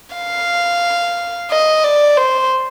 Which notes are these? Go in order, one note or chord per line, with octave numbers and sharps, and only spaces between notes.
F5
D#5
D5
C5